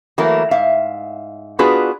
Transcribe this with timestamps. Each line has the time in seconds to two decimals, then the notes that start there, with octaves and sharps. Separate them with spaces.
0.18 E3 F#3 A3 A#3 A#4
0.51 G#2 E5 F5
1.59 B3 D4 F4 F#4 G#4 B4